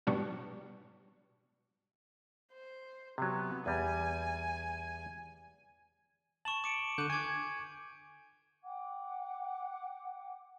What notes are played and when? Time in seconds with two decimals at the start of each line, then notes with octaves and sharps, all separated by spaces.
0.07 G#2 B2 F#3 G3 D4 F#4
2.53 C5
3.18 C3 F#3 B3
3.66 E2 G3 G#5
6.45 A5 C#6 E7 F#7
6.64 D6 C#7 D7
6.98 D3 D6 F#6 G6 D#7
7.10 G#5 C#6 D6 G#6
8.62 F#5 G5 D6